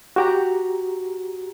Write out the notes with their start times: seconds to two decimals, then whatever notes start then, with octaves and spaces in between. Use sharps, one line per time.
0.16 F#4 G4 A#5